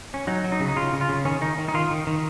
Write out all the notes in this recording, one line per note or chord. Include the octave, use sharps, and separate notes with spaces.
C#4
F#3 D#4
F#3
D#4
C#3
D#4
C#3 F4
C#3
F4
C#3
D#3 C#4
D#3 D#4
D#3
D#4
D#3 F4
D#3
D#3